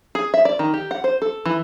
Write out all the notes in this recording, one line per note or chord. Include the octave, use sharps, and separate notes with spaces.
G#4
E5
D5
D#3
G4
F#5
C5
A4
E3